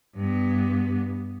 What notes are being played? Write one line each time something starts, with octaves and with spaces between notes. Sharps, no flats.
G2 B3